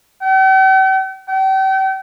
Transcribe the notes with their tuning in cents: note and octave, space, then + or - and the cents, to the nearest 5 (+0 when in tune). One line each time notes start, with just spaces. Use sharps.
G5 -45
G5 -35